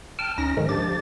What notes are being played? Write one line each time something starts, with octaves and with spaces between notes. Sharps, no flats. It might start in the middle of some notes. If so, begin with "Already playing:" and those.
G5 A5 F6
D2 C#4 D#4 A#6
G#2 D3 D#3 F3 G#3
F3 D4 G4 A6